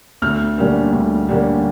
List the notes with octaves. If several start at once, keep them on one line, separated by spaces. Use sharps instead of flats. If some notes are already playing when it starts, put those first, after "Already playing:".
D2 F6
D3 G3 A#3 C#4
D2
D3 G3 A#3 C#4